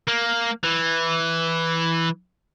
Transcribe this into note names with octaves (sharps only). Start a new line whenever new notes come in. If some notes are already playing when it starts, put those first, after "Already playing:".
A#3
E3